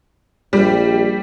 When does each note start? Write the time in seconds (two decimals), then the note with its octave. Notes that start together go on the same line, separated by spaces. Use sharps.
0.53 A#1 G3